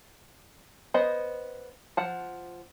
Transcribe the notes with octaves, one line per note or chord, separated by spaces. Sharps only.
B3 C5 D#5
F3 F#5 A5